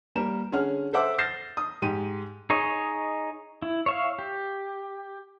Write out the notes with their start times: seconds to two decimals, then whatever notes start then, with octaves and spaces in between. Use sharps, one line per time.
0.15 G3 A#3 A#4 E7
0.52 D3 C#4 G#4 F#5 F6
0.93 A4 C5 E5 F#5 D6 E6
1.18 F6 G6 A6 A#6 C7 E7
1.57 D#6
1.82 G#2 G4 D#7
2.50 D#4 G#4 C#5 D#5
3.62 E4
3.86 C#5 E5 F5
4.19 G4